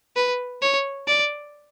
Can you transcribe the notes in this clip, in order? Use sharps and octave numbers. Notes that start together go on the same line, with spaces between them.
B4
C#5
D5